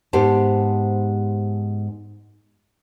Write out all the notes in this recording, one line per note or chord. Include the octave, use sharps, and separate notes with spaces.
G#2 B3 G4 C5 A5